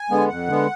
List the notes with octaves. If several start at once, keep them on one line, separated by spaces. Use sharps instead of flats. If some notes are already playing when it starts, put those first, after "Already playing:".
Already playing: G#5
D3 G#3 B3
F2 F#5
D3 G#3 B3